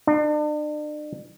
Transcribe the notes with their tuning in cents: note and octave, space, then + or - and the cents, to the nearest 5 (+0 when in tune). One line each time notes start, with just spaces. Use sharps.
D4 +40